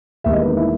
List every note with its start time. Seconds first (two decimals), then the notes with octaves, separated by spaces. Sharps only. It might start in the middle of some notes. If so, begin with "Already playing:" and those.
0.24 E1 E2 D#3 G3 A#3 E5
0.33 D#5
0.41 B4
0.48 D#4
0.56 E4